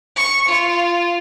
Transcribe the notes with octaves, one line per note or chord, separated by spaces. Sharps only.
C#6
F4